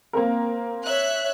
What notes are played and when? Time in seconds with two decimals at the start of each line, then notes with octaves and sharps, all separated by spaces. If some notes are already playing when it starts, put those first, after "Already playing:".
0.13 A#3 C4 A#4
0.85 C#5 E5 F#6